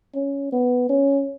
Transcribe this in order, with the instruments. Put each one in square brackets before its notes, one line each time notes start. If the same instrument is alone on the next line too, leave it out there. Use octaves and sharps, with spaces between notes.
[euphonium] C#4
B3
C#4